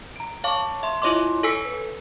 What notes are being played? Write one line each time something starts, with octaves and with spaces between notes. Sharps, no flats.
A#5 D7
C#5 F5 A5 C#6 D6
E5 C6
E4 F4 C#5 D#5 C6 D6
A4 C#5 G#5 E6 B6 C#7
B4